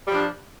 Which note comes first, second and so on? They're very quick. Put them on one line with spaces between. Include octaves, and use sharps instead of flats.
G3 F3 D4